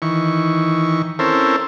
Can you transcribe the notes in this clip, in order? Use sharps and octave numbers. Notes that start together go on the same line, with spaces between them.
D#3 E3 C#6
C4 C#4 E4 A4 A#4 C5